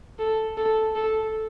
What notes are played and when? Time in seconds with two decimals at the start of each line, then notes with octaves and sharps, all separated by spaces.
0.19 A4
0.57 A4
0.96 A4